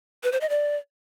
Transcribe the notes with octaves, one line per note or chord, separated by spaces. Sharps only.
B4
C5
D#5
D5